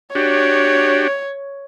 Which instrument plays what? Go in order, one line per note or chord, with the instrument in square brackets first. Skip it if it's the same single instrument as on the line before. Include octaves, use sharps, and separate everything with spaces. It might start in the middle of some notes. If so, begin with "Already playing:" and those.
[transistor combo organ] D4 F#4 G4 [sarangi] C#5